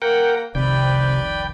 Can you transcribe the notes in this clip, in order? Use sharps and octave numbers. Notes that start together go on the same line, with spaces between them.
A#3 A#4 F#5 G5
F1 C2 C3 D#3 B4 D5 G5